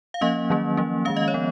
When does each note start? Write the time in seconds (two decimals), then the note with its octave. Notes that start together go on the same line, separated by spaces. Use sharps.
0.14 F5
0.21 F3 A#3 C#4 D#5
0.50 D#3 F#3 A#3 C#4
0.77 F3 A#3 C#4
1.05 D#3 G#3 C#4 F5
1.17 D#5
1.28 C#5
1.34 F3 B3